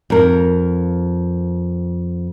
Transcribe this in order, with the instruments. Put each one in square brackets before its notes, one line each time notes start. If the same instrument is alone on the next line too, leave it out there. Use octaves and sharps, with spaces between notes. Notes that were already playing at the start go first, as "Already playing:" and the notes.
[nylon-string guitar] F2 A#4